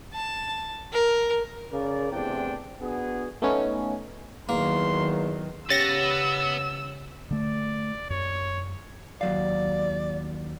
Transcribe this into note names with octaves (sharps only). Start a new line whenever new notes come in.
A5
A#4
C#3 A#4 D5
E2 A2 C3 C4 D4 G5
B3 D4 F#4 G#4
A3 B3 C#4 D#4
E2 D#3 F#3 A#3 C6
C#3 G4 B4 C#5 F#5 E6 A6 A#6
D3 A3 D5
F#2 C#5
D#2 F#3 D5 F5